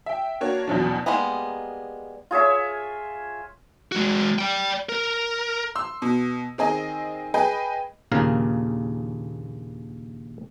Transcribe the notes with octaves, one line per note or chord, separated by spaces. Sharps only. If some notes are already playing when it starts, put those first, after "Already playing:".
E5 G5
A#3 D4 F#4 C#5
E2 B2 F3 F#3 C#4 D4
G3 G#3 A#3 B3 D#4
F4 G#4 C#5 E5
G#3 F#4
D5 G5
A#4
C6 E6
B2
D#3 C4 G#4 D#5
G#4 B4 D#5 G5
A#1 D#2 C#3 A#4 F5